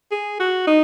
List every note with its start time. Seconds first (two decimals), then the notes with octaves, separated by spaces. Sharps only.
0.12 G#4
0.40 F#4
0.67 D#4